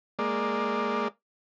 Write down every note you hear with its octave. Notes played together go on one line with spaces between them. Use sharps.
G#3 A#3 D5